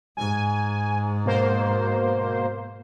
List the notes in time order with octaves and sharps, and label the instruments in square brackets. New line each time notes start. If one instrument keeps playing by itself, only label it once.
[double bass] G#2 [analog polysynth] G#5
[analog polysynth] B2 A#3 C5